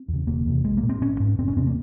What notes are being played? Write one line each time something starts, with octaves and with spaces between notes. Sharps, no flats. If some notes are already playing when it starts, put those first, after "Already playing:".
Already playing: C4
E2 C#3
E1 A#3
E2 C3
A#1 G#3
A#3
A#2
C4
G#1 C#4
G#2
F1 C4
C#4
E2 C3 C4
A#3